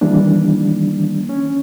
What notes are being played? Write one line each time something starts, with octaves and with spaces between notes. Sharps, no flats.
D#3 E3 G3 A#3 D4
C#4